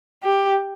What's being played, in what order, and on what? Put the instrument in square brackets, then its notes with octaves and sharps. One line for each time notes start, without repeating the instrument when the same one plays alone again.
[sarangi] G4